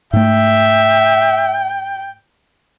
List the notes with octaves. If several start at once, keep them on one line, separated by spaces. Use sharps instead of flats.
G#2 A3 E5 G5